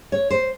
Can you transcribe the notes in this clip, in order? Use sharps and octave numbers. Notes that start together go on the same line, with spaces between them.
C#5
C5